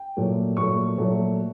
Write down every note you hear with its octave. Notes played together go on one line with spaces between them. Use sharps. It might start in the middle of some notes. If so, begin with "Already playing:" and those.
Already playing: G5
A#2 F#3 A3
A#2 F#3 A3 C#6
A#2 F#3 A3